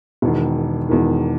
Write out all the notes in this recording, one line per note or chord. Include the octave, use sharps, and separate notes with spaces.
E1 E2 D#3
E1 E2 D#3